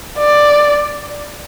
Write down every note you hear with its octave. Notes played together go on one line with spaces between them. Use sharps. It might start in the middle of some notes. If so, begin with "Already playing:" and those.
D5